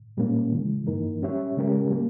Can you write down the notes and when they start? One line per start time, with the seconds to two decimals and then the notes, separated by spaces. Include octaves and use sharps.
0.17 A#2 G3 A#3 C#4
0.52 C#3 E3 G#3
0.87 G2 E3 A#3 D#4 A#4
1.22 G3 C#4 G4 C#5 E5
1.57 C#3 G#3 C#4 G4 A#4
1.91 G3 A#3